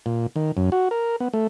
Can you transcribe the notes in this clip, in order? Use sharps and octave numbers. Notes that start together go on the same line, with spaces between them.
A#2
D#3
F#2
F#4
A#4
B3
A3